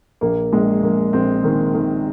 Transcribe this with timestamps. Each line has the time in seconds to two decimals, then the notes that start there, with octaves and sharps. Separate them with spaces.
0.21 A#1 A#3
0.53 A#1 G#3
0.83 A#1 A#3
1.13 A#1 C4
1.44 D#3
1.75 D#3